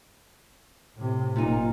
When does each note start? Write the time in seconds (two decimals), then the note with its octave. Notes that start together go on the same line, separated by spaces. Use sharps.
0.96 A2 C3
1.36 F#1 A#2 D#4